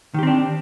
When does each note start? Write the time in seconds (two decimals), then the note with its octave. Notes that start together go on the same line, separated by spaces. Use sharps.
0.14 D#3
0.19 G4
0.23 C4
0.27 D4